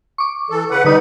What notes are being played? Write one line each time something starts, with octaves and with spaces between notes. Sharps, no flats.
C#6 D6
E3 A4
C#3 B4 F#5
D3 G3 D#4 B4 D#6